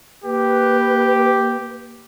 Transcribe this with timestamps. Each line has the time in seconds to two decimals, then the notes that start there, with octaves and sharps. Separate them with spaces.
0.24 A#3 G4 B4